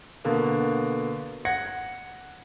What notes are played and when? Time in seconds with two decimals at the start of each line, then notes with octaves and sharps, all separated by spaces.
0.25 B2 D3 A#3
1.45 F#5 G#6 A#6 C#7